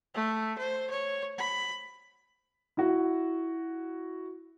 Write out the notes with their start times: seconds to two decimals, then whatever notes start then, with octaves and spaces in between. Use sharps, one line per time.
0.14 A3
0.58 C5
0.90 C#5
1.38 B5
2.77 E4 F#4